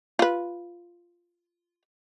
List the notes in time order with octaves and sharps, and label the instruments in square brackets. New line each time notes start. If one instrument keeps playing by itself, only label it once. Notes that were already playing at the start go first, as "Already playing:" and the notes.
[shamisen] F4 B4